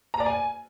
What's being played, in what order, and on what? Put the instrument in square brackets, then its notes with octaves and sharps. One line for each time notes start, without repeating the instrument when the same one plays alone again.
[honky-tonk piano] A#5
D5
G#5